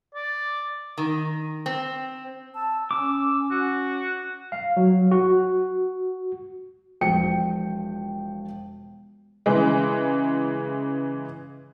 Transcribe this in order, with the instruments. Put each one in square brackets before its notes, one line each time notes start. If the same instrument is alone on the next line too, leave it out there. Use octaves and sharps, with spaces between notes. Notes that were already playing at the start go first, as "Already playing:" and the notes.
[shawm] D5
[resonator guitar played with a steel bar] D#3
C4
[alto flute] A5 [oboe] E6
[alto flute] C#4 [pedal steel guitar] D6 [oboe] E6
[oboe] F#4
[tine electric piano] F5
F#3
F#4
[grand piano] E1 F3 G5 C#7
[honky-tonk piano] C#3 E3 G#3